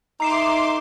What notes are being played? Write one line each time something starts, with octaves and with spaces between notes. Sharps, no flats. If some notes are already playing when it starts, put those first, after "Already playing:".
A3 D#4 A#5 C6 D6 C7 E7